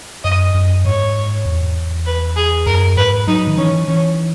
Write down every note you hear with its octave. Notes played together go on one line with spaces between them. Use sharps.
F#2 D#5
F#2
G#2 C#5
E2
B4
G#4
F#2 A#4
G#2 B4
F#3 D#4
D#3
E3 C#4
E3 C#4